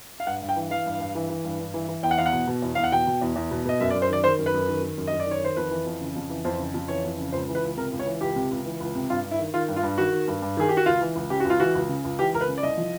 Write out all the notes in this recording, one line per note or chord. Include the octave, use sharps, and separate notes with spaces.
F5
G2 F#5
G2
G5
E3
E3 F5
G2
G2
E3
E3
G2
G2
E3
E3
E2 G5
F#5
E2 F5
F#5
B2
B2
E2
E2 F5
F#5
B2 G5
B2
E2
E2
B2
B2 D#5
F#2 E5
D5
F#2
C5
D#3 D5
D#3 C5
F#2
B4
F#2
D#3
D#3
F#2
D#5
F#2
D5
D#3 C#5
D#3 C5
F2 B4
E3
F2
C#3
F2
E3
F2 C5
C#3
F2
E3 C#5
F2
C#3
C#2 C5
E3
B4
C#2
C3 A#4
C#2
C#5
E3
C#2 G4
C3
C#2
E3
C#2
C3
G2 F4
G2
E4
D#3
D#3 F4
G2
F4
G2
D#3 F#4
D#3
G2
G2
D#3 G#4
D#3 G4
F#4
C#2 F4
E3
C#2
C#3 G4
C#2 F#4
F4
E3 F#4
C#2
C#3
C#2
E3 G4
C#2 A#4
B4
C#3
D5
C2 D#5
F3